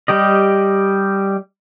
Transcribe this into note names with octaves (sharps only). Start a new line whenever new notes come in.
G3 G4 D#5